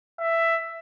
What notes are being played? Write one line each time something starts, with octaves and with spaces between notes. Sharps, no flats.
E5